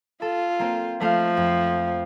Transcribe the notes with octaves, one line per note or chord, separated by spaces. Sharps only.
F4 A4
A#3 C4
F3 A3 F5
F2